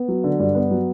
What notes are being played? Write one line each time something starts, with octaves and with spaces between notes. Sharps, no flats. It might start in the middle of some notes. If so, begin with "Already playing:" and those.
Already playing: B3
F#3
D3
G2
B3
F#3